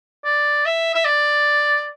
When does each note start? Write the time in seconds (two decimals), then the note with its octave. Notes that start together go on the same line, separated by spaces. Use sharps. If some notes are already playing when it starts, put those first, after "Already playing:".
0.25 D5
0.66 E5
0.95 E5
1.05 D5